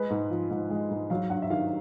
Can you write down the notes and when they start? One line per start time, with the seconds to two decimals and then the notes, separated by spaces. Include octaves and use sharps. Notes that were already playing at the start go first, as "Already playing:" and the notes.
Already playing: G#3 B4
0.10 G#2
0.30 F3
0.50 G#2
0.70 G#3
0.90 G#2
1.10 F#3 F5
1.30 G2 F#5
1.42 E5
1.50 D#3 F5